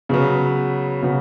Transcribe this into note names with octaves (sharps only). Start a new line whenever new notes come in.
C#3 F#3 B3
C#3 F#3 B3